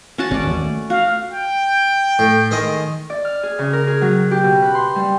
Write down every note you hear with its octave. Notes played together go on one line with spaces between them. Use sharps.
C#4 F#4 A5
G#1 C3 C#4 D5
D#2 D#3 G#3
A3
F#4 F5
G5
A2
D#3 G#3 D#5
D5
F6
G#4
C#3
A#4
G#4
F#3
G4
B2
B4
C6
G3